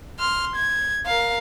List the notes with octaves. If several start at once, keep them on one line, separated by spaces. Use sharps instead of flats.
C6 F6
G#6
A#4 F5